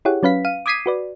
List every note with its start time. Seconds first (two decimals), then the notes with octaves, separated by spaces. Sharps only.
0.05 E4 G4 G#4 C#5 F#5
0.23 F#3 C#4 B4 F5 B6
0.45 F5 D#7
0.66 D6 D#6 G#6 B6 C7 D#7
0.86 F#4 B4 D5